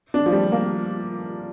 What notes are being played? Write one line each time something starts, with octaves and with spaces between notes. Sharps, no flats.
D4
F3
G3
A#3